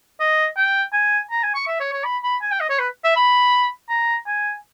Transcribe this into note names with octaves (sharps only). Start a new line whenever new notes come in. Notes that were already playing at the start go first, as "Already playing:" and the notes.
D#5
G5
G#5
A#5
G#5
C#6
E5
C#5
C#5
B5
B5
G#5
G5
D#5
C#5
B4
E5
B5
A#5
G#5